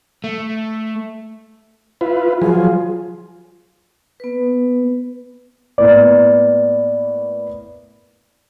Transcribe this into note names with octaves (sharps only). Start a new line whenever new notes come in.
A3
E4 F4 B4
F3 F#3 F4 G#4
B3 B4
A2 A#3 B3 D5